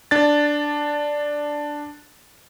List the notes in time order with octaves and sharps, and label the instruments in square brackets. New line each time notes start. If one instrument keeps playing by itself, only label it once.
[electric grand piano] D4 A6